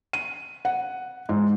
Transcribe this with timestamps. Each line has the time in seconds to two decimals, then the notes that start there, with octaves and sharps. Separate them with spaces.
0.13 D#7
0.65 F#5
1.29 G#2